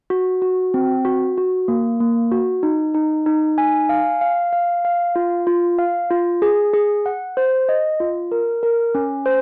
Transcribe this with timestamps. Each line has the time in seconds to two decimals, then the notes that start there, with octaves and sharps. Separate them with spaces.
0.10 F#4
0.42 F#4
0.74 C4
1.05 F#4
1.38 F#4
1.68 A#3
2.00 A#3
2.31 F#4
2.63 D#4
2.94 D#4
3.26 D#4
3.58 G#5
3.89 F5
4.21 F5
4.53 F5
4.85 F5
5.16 F4
5.47 F4
5.78 F5
6.11 F4
6.42 G#4
6.74 G#4
7.06 F#5
7.37 C5
7.69 D#5
8.00 F4
8.32 A#4
8.63 A#4
8.95 C#4
9.26 C5